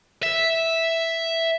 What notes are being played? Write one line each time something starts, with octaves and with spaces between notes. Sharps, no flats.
E5